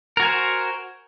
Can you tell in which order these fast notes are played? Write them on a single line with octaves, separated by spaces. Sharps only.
A#4 F#4 G#5 C5